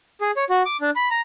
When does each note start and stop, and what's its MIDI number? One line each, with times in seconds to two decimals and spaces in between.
0.21 0.31 68
0.37 0.44 73
0.50 0.63 66
0.66 0.77 86
0.81 0.90 62
0.96 1.09 83
1.11 1.21 82